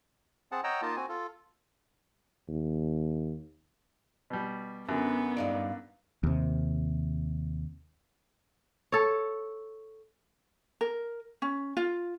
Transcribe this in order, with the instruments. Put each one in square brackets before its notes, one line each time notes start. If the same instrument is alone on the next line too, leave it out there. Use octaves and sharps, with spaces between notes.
[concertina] C4 G#4 F#5 A5
C#5 D#5 F#5 G5 A#5 E6
A#3 D#4 F4 D#5 A5
C4 F#4 G#5
F4 A4
[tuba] D#2
[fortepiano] B2 G3
[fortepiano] F#2 D3 [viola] B3 [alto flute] G#5
[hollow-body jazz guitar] G2 D#4 D5 [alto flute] F5
[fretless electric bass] D#2 C3
[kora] A4 C#5
[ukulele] A#4
C#4
F4